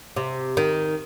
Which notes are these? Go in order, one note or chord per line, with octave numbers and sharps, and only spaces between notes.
C3
D#3